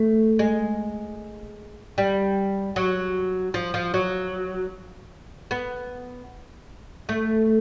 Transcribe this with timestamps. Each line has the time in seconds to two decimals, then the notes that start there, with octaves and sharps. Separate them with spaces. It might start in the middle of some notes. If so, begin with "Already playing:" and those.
Already playing: A3
0.39 G#3
1.98 G3
2.76 F#3
3.54 F3
3.74 F3
3.94 F#3
5.51 B3
7.09 A3